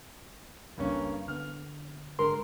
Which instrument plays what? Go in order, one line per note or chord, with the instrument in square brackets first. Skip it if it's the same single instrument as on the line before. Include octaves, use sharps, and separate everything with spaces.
[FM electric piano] G1 C#2 [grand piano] G2 A#3 C#4
[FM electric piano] D3 B3 [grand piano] F6
[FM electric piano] G#1 D3 G#3 [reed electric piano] A#4 C6